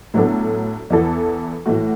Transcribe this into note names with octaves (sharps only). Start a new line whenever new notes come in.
A2 F#3 B3 D4 A4
E2 E3 B3 E4 A4
A2 E3 A3 F#4